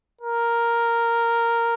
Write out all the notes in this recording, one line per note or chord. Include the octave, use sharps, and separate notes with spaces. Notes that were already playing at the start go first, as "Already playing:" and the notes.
A#4